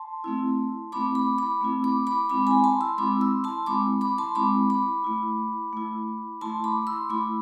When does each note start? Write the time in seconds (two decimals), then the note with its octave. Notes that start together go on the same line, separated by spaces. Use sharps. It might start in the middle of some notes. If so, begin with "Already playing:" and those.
Already playing: A5 C6
0.24 A3 C4 E4
0.92 A3 C4 E4 B5 D6
1.15 B5 D6
1.38 B5 D6
1.61 A3 C4 E4
1.84 B5 D6
2.07 B5 D6
2.29 G#3 C4 E4 B5 D6
2.47 G#5 B5
2.64 A5 C6
2.81 C6 E6
2.98 G#3 C4 E4 B5 D6
3.21 C6 E6
3.44 A5 C6
3.66 G#3 C4 E4 B5 D6
4.01 B5 D6
4.18 A5 C6
4.35 G#3 C4 E4 B5 D6
4.70 B5 D6
5.04 A3 E4
5.73 A3 E4
6.41 A3 E4 A5 C6
6.64 B5 D6
6.87 C6 E6
7.09 A3 E4 B5 D6